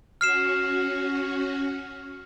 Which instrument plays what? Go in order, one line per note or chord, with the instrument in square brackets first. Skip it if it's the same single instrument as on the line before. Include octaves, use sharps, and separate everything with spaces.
[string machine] C#4 F#4 [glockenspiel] F6 C7 E7